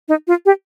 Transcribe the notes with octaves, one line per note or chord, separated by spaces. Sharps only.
D#4
F4
G4